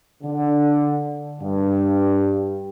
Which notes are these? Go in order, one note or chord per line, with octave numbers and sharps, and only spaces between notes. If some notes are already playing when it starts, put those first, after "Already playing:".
D3
G2